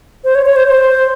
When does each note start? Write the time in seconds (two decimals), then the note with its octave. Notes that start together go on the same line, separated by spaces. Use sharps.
0.24 C5
0.35 C#5
0.46 C#5
0.56 C5
0.67 C5